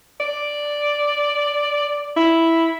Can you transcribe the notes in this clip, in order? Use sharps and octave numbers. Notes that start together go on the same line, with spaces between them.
D5
E4